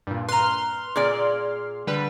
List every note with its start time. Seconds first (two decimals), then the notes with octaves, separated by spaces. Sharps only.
0.07 G2 A#2
0.29 B4 A#5 C6 F6
0.96 A#2 G#4 D5
1.87 D3 G3 B4